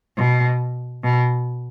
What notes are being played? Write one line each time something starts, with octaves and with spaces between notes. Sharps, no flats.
B2
B2